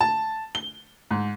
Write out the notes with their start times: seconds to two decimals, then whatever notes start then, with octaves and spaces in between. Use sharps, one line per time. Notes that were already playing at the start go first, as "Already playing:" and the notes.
0.01 A5
0.55 G7
1.11 G#2